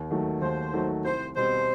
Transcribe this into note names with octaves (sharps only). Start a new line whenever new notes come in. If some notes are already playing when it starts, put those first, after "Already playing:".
Already playing: D#2
D#3 F#3 A3
D#2 C5
D#3 F#3 A3
C2 C5
B2 G3 C4 C5